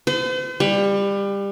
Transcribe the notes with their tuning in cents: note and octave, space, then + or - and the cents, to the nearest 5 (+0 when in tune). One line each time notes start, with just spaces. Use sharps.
C5 -45
G3 +25